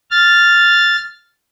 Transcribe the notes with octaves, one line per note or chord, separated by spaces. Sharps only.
F6 A6